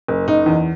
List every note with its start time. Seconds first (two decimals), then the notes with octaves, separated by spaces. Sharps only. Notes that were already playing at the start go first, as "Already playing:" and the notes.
0.08 F#1
0.28 F#1 D#4
0.46 E2